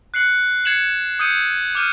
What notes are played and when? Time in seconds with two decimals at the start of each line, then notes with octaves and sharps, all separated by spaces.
0.14 F#6 C7 C#7 F#7
0.65 G#6 C7 C#7 E7 F#7
0.90 E7
1.19 D#6 E6 G6 C#7 D#7 E7
1.75 D6 F6 G6 D#7